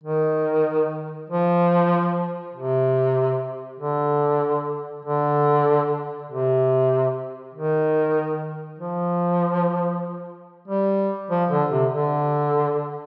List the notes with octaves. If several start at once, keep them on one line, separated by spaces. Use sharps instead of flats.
D#3
F3
C3
D3
D3
C3
D#3
F3
G3
F3
D3
C3
D3